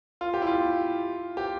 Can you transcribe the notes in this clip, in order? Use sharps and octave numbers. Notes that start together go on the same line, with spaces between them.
F4
G4
E4
F4
G4